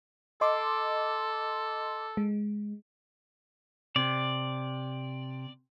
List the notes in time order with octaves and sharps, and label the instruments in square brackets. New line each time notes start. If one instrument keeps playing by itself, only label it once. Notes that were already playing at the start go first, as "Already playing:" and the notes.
[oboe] A4 [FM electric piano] D#5 C6 D6
[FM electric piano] G#3
[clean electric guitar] C3 [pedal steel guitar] D5